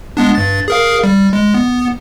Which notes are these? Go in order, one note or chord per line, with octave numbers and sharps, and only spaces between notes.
G#3 B3 D4
G2 A6
G#4 A#4 F5
G3
G#3
B3